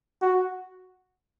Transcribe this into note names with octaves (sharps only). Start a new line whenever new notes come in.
F#4